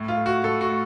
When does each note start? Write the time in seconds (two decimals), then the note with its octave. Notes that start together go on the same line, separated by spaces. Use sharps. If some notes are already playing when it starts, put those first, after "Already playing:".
Already playing: A2
0.08 F4
0.17 A3
0.26 F#4
0.44 A2 A4
0.61 F#4
0.70 A3